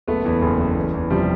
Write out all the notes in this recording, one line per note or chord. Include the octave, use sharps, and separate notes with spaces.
F#1 A3 B3
E2
F#1
F#1
E2
E2
C3 F3 G3